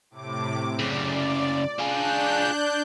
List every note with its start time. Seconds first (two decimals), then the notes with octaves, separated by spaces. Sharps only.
0.10 A2 C3 D6
0.79 F#2 C#3 D5
1.79 D4 F4 G#4 F#6 G6